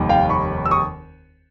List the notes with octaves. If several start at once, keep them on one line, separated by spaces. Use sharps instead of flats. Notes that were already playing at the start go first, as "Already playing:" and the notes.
Already playing: F1 D#2 D#3 G3 A#3
F5 G5
B5 C#6
E6
C#6 D#6